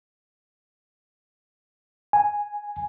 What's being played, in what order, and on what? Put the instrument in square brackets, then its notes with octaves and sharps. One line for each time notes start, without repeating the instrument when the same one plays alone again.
[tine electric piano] G#5